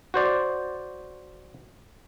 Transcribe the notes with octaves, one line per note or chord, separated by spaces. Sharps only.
F#4 C5 D5